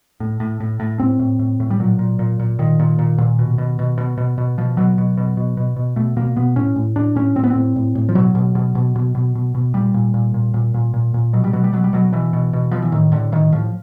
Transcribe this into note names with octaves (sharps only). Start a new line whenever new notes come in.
A2
A2
A2
A2
A2 C4
A2
A2
A2
G3
A#2 F#3
A#2
A#2
A#2
A#2 D#3
A#2
A#2
A#2
B2
B2
B2
B2
B2
B2
B2 F3
B2 F#3
B2
B2
B2
B2
B2
B2 A3
B2 A#3
B2 B3
A2 C#4
A2
A2 D4
A2 C#4
A2 C4
B3
C4
A2
A2
A2
F3
B2 F#3
B2
B2
B2
B2
B2
B2
B2
A#2 G3
A#2
A#2
A#2
A#2
A#2
A#2
A#2
B2 F#3
G3
B2 F#3
G3
B2 F#3
G3
B2 F#3
B2 E3
B2
B2
B2 F3
E3
A2 D#3
A2 D3
A2 D#3
A2 F3